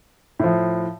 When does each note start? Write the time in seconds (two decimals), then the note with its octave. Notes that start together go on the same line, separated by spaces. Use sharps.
0.39 A2 F3